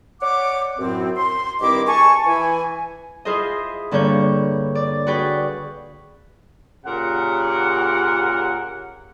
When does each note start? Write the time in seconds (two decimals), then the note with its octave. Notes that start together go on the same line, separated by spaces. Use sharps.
0.22 C#5 D5 F#5 D6
0.79 F#2 A2 C4
1.17 C6
1.61 G2 D#3 C4 E4 D#5 D6
1.88 G#5 A5 C#6
2.26 E3 E4 G#5
3.25 E4 F4 G#4 C5 D#5
3.91 G2 D3 A#3 C#5 G6
4.75 D5
5.07 F#4 G#4 B4 D5 G5
6.86 A#2 C#3 G4 A#4 F#5